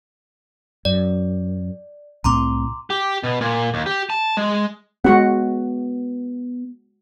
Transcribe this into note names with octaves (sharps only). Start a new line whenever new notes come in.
F#2 D5
C2 A2 C4 A#5 C6 D6
G4
B2
A#2
D#2
G4
A5
G#3
G#3 B3 F#4 F#5